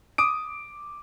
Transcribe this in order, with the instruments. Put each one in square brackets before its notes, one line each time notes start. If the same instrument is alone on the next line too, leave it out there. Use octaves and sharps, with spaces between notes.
[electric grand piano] D6 D#6 D7